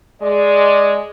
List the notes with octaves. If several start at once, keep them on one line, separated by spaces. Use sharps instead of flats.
G#3 D5